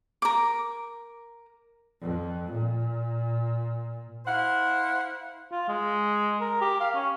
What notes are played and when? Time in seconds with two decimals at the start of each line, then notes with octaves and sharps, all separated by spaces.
0.22 A#4 D6
2.01 F2
2.51 A#2
4.26 E4 C5 F5 F#5
5.51 F4
5.69 G#3
6.41 A#4
6.61 G4
6.80 F5
6.95 C#4